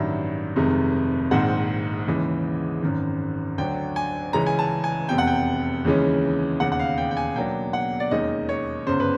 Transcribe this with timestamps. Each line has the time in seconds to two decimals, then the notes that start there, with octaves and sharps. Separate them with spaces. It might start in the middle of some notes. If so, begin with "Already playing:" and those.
Already playing: A1 G2 D#3 F#3 E5
0.56 F1 F2 C3 D#3 G#3
1.31 A#1 G#2 D#3 G#3 C4 F#5
2.07 D#2 C#3 E3 G#3
2.82 G#1 F#2 D#3
3.58 D2 D3 F#3 G5
3.96 G#5
4.33 C#2 C#3 E3 G#3 C#4 A#5
4.46 G#5
4.59 A5
4.84 G#5
5.09 F1 E2 C3 G5
5.18 F#5
5.27 G5
5.84 D#2 C#3 E3 G#3 C#4
6.60 E1 D#2 C#3 F#5
6.72 F#5
6.79 F5
6.98 G5
7.11 G5
7.17 G#5
7.36 B1 B2 F#3 A#3 D4 G5
7.73 F#5
8.00 D5
8.11 E1 D#2 D#3 G#3 C#4 D#5
8.49 C#5
8.87 G1 F#2 C#3 C5
9.00 B4